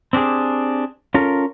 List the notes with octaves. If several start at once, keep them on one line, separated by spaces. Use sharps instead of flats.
C4 D4 G4 G#4
C#4 F4 A4 A#4